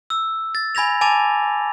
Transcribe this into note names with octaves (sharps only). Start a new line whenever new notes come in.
E6
A6
G#5 B5 G#6 A#6 F7
G#5 A5 D6 A6 F7